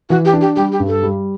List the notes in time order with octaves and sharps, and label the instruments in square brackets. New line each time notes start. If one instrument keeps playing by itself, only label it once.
[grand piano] E3 [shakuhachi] F#4
[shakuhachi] G4
[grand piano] D4
[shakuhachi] G4
[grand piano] G3 [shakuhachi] G4
[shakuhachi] G4
[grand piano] G2
[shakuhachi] A4
[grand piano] G3